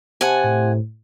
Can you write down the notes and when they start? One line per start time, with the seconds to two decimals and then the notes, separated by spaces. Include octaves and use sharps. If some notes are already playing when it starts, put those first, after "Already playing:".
0.21 C3 F#5 G#5 A5
0.44 A2